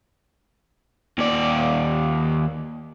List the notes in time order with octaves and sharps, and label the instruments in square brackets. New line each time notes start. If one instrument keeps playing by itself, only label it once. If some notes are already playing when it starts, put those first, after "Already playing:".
[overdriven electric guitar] D#2 D5